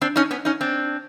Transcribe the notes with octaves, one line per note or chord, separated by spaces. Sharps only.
C4 D4
C#4 D#4
B3 C#4
C#4 D#4
C4 D4